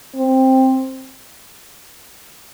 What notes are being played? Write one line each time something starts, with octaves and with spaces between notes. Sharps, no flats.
C4